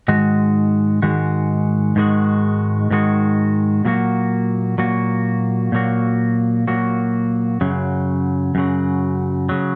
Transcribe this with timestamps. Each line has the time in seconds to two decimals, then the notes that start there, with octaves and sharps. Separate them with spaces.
0.08 G#2 D#3 G#3 F#4
1.02 G#2 D#3 G#3 F#4
1.96 G#2 D#3 G#3 F#4
2.91 G#2 D#3 G#3 F#4
3.85 A#2 F#3 A#3 F#4
4.78 A#2 F#3 A#3 F#4
5.72 A#2 F#3 A#3 F#4
6.67 A#2 F#3 A#3 F#4
7.61 F#2 C#3 F#3
8.55 F#2 C#3 F#3
9.49 C#3 F#3